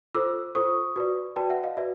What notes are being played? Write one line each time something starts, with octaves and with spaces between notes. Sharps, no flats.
F4 A4 C5 D6 E6
F4 A4 C5 C#6 D#6
F#4 B4 D5
F#4 B4 D5 G5 A5
E5 F#5
D#5 F5
F#4 B4 D5 E5